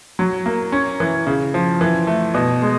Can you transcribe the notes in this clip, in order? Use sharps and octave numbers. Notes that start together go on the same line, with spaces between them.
F#3
A#3
C#4
E3
C#3
F3
E3
A3
B2
G#3